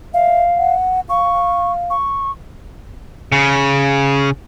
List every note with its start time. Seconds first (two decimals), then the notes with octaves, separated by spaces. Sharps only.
0.14 E5 F5
0.57 F#5
1.09 F5 C#6
1.90 C#6
3.32 C#3